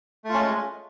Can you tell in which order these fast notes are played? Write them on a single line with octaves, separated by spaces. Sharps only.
A3 F4 C#4 G#3